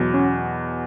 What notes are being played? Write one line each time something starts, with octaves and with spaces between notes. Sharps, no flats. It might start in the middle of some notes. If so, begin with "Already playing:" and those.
Already playing: E2 B2 F#3
C#4